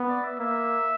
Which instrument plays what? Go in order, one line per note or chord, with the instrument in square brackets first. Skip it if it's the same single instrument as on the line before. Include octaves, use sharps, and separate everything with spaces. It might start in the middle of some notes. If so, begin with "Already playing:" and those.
Already playing: [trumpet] B3
[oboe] D5
E5
[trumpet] A#3 [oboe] E5